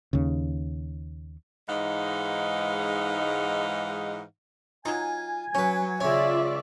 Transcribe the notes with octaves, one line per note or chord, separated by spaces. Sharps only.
D#2 C#3
G#2 E3 G#3 D#4 F5 F#5
F#3 D#4 F4 G#5
F#3 C#4 B4 C#5
C#2 C#4 F4 C#5 D5 E5